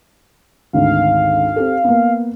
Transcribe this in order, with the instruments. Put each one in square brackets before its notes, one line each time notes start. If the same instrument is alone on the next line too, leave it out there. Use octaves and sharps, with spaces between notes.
[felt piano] G#1 D2 [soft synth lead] F5
[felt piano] C4 G4 A4
A#3 B3